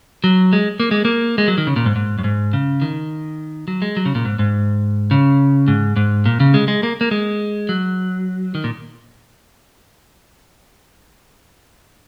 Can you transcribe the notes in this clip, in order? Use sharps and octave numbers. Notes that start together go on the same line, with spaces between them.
F#3
G#3
A#3
G#3
A#3
G#3
F#3
D#3
C#3
A#2
G#2
G#2
F#2
G#2
C#3
D#3
F#3
G#3
F#3
C#3
A#2
G#2
G#2
C#3
G#2
G#2
A#2
C#3
G#3
G#3
A#3
A#3
G#3
F#3
D#3
A#2